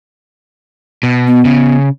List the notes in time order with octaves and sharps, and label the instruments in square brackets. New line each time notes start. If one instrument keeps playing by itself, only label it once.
[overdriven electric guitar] B2
[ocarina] B3
[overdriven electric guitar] C#3